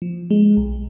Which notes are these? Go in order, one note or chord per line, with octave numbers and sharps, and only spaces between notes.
F3
G#3
B1